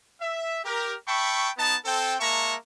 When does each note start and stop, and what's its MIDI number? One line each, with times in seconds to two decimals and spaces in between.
0.20 0.60 76
0.64 0.94 67
0.64 0.94 70
1.07 1.50 76
1.07 1.50 79
1.07 1.50 81
1.07 1.50 83
1.07 1.50 85
1.57 1.76 59
1.57 1.76 63
1.57 1.76 81
1.85 2.15 60
1.85 2.15 69
1.85 2.15 79
2.20 2.55 56
2.20 2.55 58
2.20 2.55 76
2.20 2.55 81
2.20 2.55 82
2.20 2.55 85